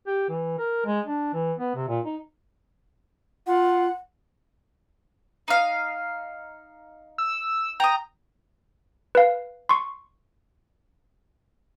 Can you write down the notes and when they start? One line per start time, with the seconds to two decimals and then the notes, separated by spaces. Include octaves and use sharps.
0.07 G4
0.29 E3
0.59 A#4
0.86 G#3
1.06 D4
1.34 E3
1.59 B3
1.75 C3
1.88 A#2
2.05 D#4
3.47 F4 F#5
5.48 D#4 F5
7.18 E6
7.80 G5 A#5 D#6
9.15 B4 F5
9.69 C6 C#6